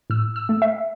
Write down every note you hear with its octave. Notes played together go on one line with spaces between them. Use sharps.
A2 E6
E6
A3
E5